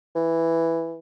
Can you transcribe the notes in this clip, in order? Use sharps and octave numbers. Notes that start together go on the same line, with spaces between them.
E3